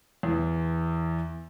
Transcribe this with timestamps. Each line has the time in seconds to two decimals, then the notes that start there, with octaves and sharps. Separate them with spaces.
0.23 E2 E3